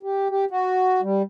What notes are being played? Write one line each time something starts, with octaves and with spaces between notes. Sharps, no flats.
G4
G4
F#4
G3